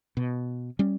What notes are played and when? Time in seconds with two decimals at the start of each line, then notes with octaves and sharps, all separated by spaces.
0.17 B2
0.79 G3 C#4